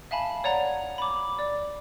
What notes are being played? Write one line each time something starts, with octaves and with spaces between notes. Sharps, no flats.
E5 F5 G#5 A5 B5
C#5 D5 F#5 A#5
B5 D6
D5